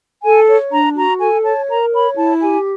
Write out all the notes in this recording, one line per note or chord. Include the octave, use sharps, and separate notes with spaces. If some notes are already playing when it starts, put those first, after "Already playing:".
A4 G#5
C#5
D4 A#5
F#4 A#5
A4 G#5
C#5 A5
A#4 A#5
C#5 B5
E4 A5
G4 G#5